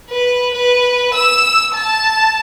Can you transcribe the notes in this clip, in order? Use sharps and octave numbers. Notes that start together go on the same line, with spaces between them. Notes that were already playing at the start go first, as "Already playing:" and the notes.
B4
B4
E6
A5